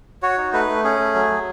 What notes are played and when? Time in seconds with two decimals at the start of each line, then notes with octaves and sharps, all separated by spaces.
0.22 F#4 C#5
0.38 D#4
0.53 A3 B4
0.68 A3
0.84 C#4 G#4
0.99 A3
1.14 F#3
1.30 F#3